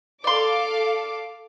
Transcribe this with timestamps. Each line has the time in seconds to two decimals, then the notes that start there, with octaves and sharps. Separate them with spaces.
0.24 A4 D5 F5 C6 D6